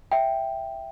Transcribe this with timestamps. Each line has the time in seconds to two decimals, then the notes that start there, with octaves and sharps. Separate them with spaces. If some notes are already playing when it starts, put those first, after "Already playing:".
0.12 E5 G5